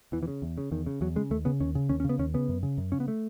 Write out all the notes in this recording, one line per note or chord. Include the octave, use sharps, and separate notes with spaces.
E2 E3
E3
C#3
E2
C#3
E2 D#3
C#3
E2 F#3
C#3 G#3
D#2 A3
C#3 B3
D#2 C#4
C#3
D#2 C#4
C#4
C#3 B3
D#2 C#4
C#3 B3
F#2
C#3
F#2
C#3 C#4
B3
A3